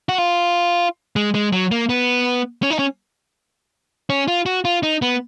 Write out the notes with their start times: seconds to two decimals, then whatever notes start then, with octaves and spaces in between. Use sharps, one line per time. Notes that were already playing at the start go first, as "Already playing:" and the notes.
0.09 F#4
0.18 F4
1.16 G#3
1.34 G#3
1.52 F#3
1.71 A#3
1.89 B3
2.63 C#4
2.70 D#4
2.79 C#4
4.10 C#4
4.28 F4
4.46 F#4
4.65 F4
4.83 D#4
5.02 B3